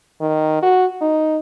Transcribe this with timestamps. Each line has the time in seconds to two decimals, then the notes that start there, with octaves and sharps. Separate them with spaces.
0.21 D#3
0.62 F#4
1.01 D#4